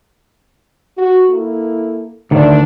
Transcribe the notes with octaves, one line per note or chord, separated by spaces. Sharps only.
F#4
A#3 E4 A4
D2 A2 D#3 A3 D4